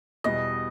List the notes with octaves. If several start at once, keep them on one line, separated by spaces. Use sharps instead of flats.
E2 B2 G3 D#5